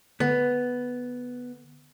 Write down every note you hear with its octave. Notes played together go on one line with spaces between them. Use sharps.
D3 B3